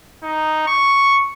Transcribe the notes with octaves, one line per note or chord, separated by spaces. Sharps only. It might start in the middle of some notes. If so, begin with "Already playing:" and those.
D#4
C#6